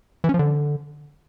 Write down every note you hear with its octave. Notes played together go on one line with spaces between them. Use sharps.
E3
C#4
F3
D3